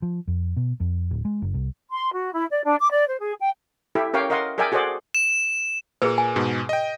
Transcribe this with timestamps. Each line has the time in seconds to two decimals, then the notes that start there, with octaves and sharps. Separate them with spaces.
0.02 F3
0.27 F2
0.57 B2
0.80 F2
1.11 D1
1.25 G#3
1.42 F#1
1.54 C2
1.90 C6
2.14 F#4
2.34 E4
2.51 D5
2.64 D4
2.80 D6
2.92 D5
3.08 C5
3.20 G#4
3.40 G5
3.95 E4 G4 A4 E5
4.13 C#4 G4 A#4 C#5 F5 G5
4.30 A#4 D#5 F5 F#5 C6
4.58 G#4 A#4 D5 E5 G5 G#5
4.72 F#4 G#4 A4 C5 D5 F#5
5.15 E7
6.02 A#2 A#3 G#4 B4
6.18 G#5
6.36 G#2 B2
6.69 D#5 G5